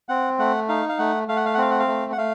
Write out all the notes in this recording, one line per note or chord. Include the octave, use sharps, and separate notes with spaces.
C4 F#5
A3 F#5
D#4 F5
F5
A3 F#5
A3 F5
F#5
F5
F#5
C4 F5
F#5
F5
A3
F#5
A3 F5